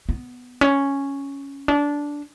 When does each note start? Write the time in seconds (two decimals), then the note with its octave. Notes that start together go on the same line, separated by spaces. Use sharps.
0.09 B3
0.61 C#4
1.68 D4